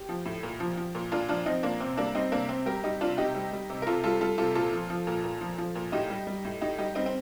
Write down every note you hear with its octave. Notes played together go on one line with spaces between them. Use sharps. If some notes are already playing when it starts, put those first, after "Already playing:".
Already playing: G4
F3
A2
A#2
F3
F3
A#2
A#2 D4 F4
F3 D4 F4
F3 C4 D#4
A#2 A#3 D4
C3 C4
G3 A#3 D4
G3 C4 D#4
C3 A#3 D4
C3 C4
G3 G4 A#4
G3 D#4 G4
C3 D4 F4
C3 D#4 G4
G3
G3
C3
A#4
C3 F4 A4
G3 F4 A4
G3 F4 A4
C3 F4 A4
A#2 F4 A4
F3
F3
A#2
A#2
F3
F3
A#2
A2 D#4 G4
G3
G3
A2
A2 D#4 G4
G3 D#4 G4
G3 C4 D#4
C4